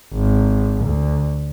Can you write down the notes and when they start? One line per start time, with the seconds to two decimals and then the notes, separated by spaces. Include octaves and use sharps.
0.13 G#1
0.84 D2